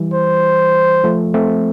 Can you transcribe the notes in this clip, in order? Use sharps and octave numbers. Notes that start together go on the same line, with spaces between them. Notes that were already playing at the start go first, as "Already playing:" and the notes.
Already playing: E3 G3
C5
F3 A3
A3 C4